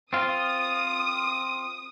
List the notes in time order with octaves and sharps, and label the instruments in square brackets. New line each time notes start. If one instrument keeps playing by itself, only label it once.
[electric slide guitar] C4 F4 [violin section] D#6